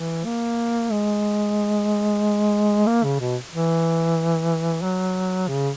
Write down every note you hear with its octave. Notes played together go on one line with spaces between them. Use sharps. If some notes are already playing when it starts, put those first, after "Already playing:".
Already playing: E3
A#3
G#3
A#3
C#3
B2
E3
F#3
C#3